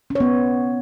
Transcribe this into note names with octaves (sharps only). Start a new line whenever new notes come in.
C#4
C#5
B3